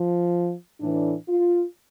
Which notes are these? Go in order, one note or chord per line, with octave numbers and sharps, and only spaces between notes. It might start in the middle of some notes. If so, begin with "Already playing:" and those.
Already playing: F3
A2 E3 D4
F4